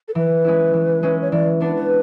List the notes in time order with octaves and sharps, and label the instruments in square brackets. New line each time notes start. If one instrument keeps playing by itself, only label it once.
[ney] A4
[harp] E3 [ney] B4
[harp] G#3 C#4 E4
E3
G#3 C#4 E4
[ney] C#5
[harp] E3 [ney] D5
[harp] B3 D4 [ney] B4
[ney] B4